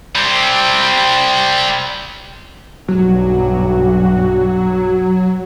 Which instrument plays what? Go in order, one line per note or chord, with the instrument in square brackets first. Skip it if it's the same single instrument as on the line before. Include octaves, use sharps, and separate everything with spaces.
[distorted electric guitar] G3 C4
[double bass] B1 G2 [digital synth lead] F#3